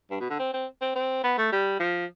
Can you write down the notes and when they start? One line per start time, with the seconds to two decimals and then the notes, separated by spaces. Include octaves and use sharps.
0.11 G2
0.20 B2
0.30 D3
0.39 C4
0.53 C4
0.81 C4
0.95 C4
1.24 B3
1.38 A3
1.52 G3
1.80 F3